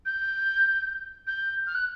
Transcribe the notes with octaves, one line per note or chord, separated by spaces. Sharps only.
G6
G6
F6
F#6